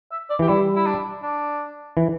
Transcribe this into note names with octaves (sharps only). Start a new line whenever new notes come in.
E5
D5
E3 G4
G3 E4
E4
D4
D4
E3